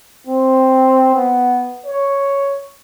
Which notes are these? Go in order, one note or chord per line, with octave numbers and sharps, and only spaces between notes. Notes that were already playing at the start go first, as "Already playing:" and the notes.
C4
B3
C#5